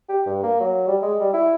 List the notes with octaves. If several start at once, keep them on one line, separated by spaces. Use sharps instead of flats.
G4
G2
A#3
F#3
G3
G#3
G3
E4